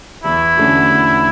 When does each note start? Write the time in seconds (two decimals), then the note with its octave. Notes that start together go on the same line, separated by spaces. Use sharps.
0.23 E2 E4
0.57 D3 A3 C#4 F#4
0.90 E2